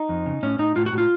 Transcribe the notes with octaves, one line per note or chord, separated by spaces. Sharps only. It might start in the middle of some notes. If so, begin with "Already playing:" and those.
Already playing: D#4
F2
C#3
A2 C#4
A2 D#4
A2 F4
F#4
A2
F4